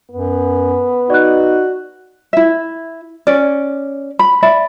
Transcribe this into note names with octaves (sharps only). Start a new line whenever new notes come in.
F#2 B3
D#4 F#4 D5 F#6
E4 E5
C#4 D5
B5
D5 E5 B5